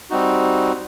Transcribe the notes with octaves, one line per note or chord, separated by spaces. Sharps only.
G3 C4 D#4 F#4